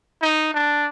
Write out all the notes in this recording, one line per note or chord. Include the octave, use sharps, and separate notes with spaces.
D#4
D4